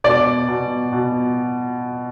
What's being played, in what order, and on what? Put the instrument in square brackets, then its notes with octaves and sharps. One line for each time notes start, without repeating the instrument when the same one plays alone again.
[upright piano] B2 [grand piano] D5
[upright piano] B2
B2